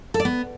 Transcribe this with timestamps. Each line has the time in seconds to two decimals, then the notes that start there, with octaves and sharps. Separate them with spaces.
0.14 A4
0.20 D5
0.25 B3